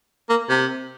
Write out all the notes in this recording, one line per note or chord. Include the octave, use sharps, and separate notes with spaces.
A#3
C3